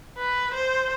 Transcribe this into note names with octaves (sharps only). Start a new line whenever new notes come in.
B4
C5